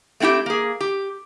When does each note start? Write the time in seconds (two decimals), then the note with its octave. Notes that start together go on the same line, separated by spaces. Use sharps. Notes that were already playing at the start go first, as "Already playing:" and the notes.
0.20 A3 C4 E4 F#4 G4
0.46 A#3 G#4
0.80 G4